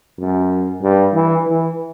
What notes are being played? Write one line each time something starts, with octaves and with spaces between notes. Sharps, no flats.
F#2
G2
E3
E3